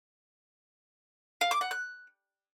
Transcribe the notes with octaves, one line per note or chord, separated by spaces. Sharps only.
F5
D6
F#5
F#6